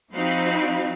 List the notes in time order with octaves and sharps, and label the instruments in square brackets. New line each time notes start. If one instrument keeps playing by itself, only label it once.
[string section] F3 C4 D#4 F#4 F5 B5